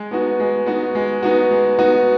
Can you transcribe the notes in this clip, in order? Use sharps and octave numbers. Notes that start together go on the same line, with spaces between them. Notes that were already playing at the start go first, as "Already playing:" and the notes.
Already playing: G#3
B3 D#4 F#4
G#3
B3 D#4 F#4
G#3
B3 D#4 F#4
G#3
B3 D#4 F#4